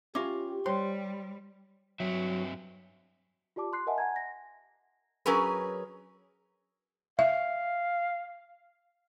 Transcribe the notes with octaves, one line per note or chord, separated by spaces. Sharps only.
C#4 F4 G4 E5 D6
G3 C5 C#5 G5 C6
G2 F#3 C4 E5
F4 G4 D5 A5 D6
C6 F#6 C7
A#4 D#5 E5 F#5 G#5 A5
F#5 G#5 A#5 G#6
A#6
F#3 C#4 G#4 A#4 B4
E5 F5